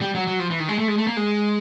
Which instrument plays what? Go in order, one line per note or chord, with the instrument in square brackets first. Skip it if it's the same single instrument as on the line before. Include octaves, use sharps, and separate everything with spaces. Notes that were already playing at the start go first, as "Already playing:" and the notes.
[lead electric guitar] G3
F#3
F#3
F3
E3
D#3
G#3
A3
G#3
A3
A#3
G#3